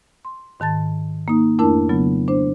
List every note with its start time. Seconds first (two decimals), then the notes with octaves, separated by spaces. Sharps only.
0.25 C6
0.60 G#2 D#3 A5 A6
1.28 A#3 D#4
1.59 F2 A3 D4 E4 A#4 A5
1.89 C#3 F#3 B3
2.28 D4 C5